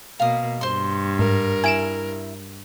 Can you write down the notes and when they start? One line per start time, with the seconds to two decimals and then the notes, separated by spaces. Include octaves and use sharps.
0.20 B2 A#3 F5 D#6
0.61 G2 C5 C6
1.19 G#2 A#4
1.64 E4 G#5 D7 E7